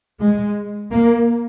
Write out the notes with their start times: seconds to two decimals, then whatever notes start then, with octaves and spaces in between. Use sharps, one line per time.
0.21 G#3
0.91 A#3